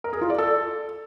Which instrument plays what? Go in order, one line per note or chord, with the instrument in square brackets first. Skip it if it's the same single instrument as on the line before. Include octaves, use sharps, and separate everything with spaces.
[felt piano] A#4
G#4
F4
D5
A4